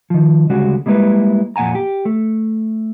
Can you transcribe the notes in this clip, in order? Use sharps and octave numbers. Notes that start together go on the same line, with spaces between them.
D#3 F3
D2 C#3 G3 G#3 F#4
G3 G#3 A#3 E4 B4
F2 A#2 F#5 G#5 A#5
G4
A3